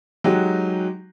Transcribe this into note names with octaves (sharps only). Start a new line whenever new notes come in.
F#3 G#3 D#4 F#4 G4